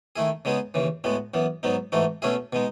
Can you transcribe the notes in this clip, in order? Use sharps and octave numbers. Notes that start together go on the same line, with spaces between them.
D#3 A3 E4 G#4
C#3 G#3 B3 D#4 G#4
D#2 C#3 E3
A2 G#3 B3 F#4
F#2 E3 B3
G#2 F#3 B3 D#4
G#2 E3 A3 D#4 F#4
B2 A3 C#4 E4 G#4
B2 G#3 D#4